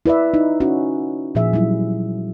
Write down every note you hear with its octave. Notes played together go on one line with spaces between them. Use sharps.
E4 B4 D5 E5
D#4
C#4 F#4
A#2 F3 G#4 E5
F#3 G3 E4